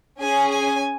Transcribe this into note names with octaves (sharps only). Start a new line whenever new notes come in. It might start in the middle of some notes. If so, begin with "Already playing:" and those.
C#4 G#4 G#5
G#5